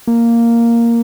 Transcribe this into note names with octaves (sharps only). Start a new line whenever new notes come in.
A#3